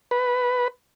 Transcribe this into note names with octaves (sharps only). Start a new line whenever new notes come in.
B4